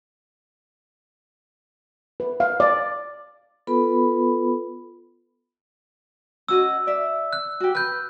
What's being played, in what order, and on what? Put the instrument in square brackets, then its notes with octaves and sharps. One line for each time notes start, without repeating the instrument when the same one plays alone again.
[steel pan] B4
F5
D5
[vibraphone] B3 F4 A4 B4 B5
[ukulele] C#4 F#4 D#5 [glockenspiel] E6
[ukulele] D5 E5
[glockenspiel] F#6
[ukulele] F#4 G4
[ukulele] B4 [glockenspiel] F#6 G6